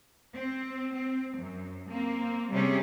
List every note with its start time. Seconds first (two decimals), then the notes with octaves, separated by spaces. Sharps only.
0.34 C4
0.94 C4
1.37 F#2
1.90 A#3 C4
2.51 C3 G3 C4 C#4 G4 G#4